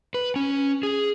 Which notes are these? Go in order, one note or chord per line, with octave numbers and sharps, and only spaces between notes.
B4
C#4
G#4